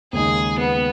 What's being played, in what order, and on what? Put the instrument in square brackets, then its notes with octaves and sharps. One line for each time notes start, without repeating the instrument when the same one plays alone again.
[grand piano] D#2 C#3 G#3 D#4 [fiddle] G#4
[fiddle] B3